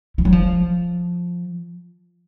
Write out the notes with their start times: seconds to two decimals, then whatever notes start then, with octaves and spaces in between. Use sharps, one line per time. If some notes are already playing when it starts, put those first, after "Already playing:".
0.18 F3
0.25 F#3
0.32 F3